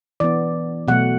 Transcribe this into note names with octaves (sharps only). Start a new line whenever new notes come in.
E3 B3 D5
B2 F#3 A3 F#5